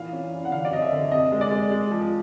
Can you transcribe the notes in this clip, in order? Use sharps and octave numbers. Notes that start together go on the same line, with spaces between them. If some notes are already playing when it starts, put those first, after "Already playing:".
Already playing: A#2 E3 F5
C#4
E3
F#5
D3 F5
D5
F#3 D#5
E5
D3
C3 D#5
G#3
D5
G#3
G#3
F3